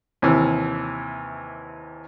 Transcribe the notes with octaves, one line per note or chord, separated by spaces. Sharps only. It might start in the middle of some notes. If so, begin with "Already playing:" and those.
D#2 C3 E3